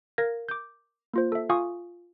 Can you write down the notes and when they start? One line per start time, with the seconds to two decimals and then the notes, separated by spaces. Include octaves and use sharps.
0.18 A#4 F5 G#6 A#6
0.49 D6 G6
1.14 A#3 F4 C5
1.32 A4 E5
1.50 F4 F5 G#5 C#6 D#6